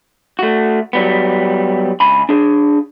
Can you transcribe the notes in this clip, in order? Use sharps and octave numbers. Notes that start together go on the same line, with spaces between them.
A3 F#4
F#3 G3 B3
C#2 G#5 B5
D4 G#4